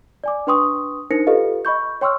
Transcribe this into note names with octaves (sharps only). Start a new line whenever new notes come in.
D5 G#5 D6
D4 B4 G5 C6 C#6 D#6
D4 D#4 A#4 C5 A#6 C#7
F4 G4 A4 B4 D#5 F5
D#5 B5 C#6 G6
C#5 G5 C6 C#6 E6 F6